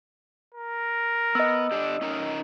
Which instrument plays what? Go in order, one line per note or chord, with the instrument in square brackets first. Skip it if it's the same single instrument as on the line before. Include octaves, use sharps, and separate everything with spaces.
[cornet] A#4
[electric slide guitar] B3 [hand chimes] D#5 E6
[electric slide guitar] D3 D4 G4
C#4 D#4 A#4